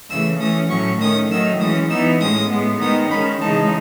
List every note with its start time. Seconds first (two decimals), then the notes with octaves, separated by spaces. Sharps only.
0.10 C#3 E3 A3 E6
0.40 E3 A3 C#4 D#6
0.70 A2 F#3 A3 C#4 C#6
1.00 D#3 A3 C#4 D#6
1.30 D#3 F#3 A3 D#4 E6
1.60 E3 G#3 C#4 D#6
1.90 E3 B3 D#4 E6
2.20 A2 G#3 C#4 D#6
2.50 A2 G#3 B3
2.80 D#3 G#3 B3 D#4 D#6
3.10 D#3 G#3 C#4 B5
3.41 C#3 E3 G#3 D#4 A5